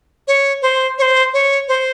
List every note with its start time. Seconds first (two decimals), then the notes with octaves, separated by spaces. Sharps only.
0.28 C#5
0.62 C5
0.98 C#5
1.02 C5
1.33 C#5
1.68 C5